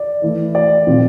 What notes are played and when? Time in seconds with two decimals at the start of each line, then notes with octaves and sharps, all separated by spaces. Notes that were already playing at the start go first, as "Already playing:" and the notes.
Already playing: D5
0.22 E3 A3 E4
0.55 D5
0.87 A#2 F3 C4 F4